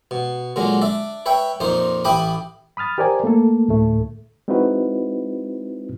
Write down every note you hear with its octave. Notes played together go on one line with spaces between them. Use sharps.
B2
A#2 D3 F#3 G#3
D4 D5 E5
B4 C#5 E5 G5
F2 A#2 D#4 C5
A1 E4 G5 B5 D6 D#6
B5 D#6 F6 A6
G4 A#4 C5 D5 G#5
A3 A#3 A4
D2 A2 A3
G#3 C4 D#4 E4 F#4 B4